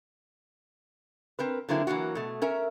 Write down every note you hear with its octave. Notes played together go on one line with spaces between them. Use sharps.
C4 A#4 B4
D3 F#3 A#3 C4 E4 G#4
E3 F#3 A#3 F#4
B2 A3
C#4 A#4 E5